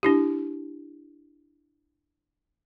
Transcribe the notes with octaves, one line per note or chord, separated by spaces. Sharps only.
D4 E4 G4